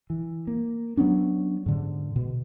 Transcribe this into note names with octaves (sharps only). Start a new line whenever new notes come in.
E3
A#3
F#3 B3 C#4 D4
G#2 D3
B2